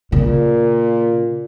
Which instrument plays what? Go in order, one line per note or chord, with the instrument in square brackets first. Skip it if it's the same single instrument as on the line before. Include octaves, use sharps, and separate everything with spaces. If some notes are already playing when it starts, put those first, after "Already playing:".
[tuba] A#2 [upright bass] C#3